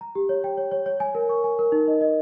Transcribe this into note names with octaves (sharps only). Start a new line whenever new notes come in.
A#5
G4
C#5
G5
C#5
C#5
C#5
G#5
A#4
C#6
G#5
A#4
D#4
D#5
D#5